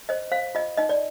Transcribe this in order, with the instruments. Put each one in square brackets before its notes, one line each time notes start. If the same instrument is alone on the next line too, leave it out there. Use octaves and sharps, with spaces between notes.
[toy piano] C5 D#5
C5 F5
F4 D#5
D#4 D#5
D5